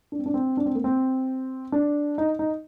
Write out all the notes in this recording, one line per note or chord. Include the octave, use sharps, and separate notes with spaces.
D4
C4
D4
C4
D4
C4
A#3
C4
D4
D#4
D#4